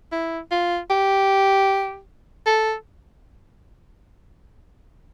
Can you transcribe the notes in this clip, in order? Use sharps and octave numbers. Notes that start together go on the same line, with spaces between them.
E4
F4
G4
A4